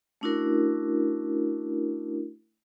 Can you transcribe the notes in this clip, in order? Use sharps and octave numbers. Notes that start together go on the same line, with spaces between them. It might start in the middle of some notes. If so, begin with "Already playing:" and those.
A3 C#4 D4 E4 F#4 A#4